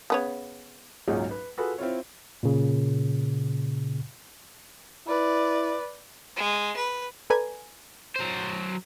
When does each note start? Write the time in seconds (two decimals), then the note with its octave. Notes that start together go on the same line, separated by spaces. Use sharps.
0.10 C#3 B3 C#5
1.08 G#1 C#2 A#2 F#3 C#4 D#4
1.31 B4
1.58 F4 F#4 G#4 A4 B4
1.78 C4 E4 F4 C#5
2.43 A#2 C#3
5.07 E4 B4 D5
6.36 G#3
6.76 B4
7.30 A4 B4 D5 G#5 A#5
8.16 F#3 C5